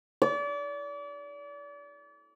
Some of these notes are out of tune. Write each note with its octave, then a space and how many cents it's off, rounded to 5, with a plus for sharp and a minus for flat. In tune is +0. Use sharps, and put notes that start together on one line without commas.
D5 -35